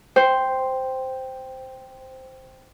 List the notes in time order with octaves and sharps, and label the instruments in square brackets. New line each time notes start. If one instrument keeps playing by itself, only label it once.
[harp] C5 [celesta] G5